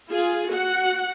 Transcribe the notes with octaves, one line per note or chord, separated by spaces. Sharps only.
F4 G#4
F#4 F#5